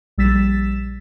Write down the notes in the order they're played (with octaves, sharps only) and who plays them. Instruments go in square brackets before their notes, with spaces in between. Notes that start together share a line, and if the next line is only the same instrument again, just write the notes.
[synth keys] A#1 G3 E6 A6 B6 E7